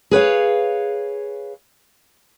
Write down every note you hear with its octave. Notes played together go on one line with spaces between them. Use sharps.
G#4 B4 C#5 F5